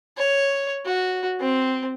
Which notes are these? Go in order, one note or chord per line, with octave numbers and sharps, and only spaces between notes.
C#5
F#4
C4